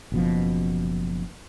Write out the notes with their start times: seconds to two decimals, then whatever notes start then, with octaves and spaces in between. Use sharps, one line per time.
0.12 F#1 B2 F3